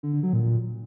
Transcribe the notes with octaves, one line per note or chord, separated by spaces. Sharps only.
D3
D3
F#3
A#2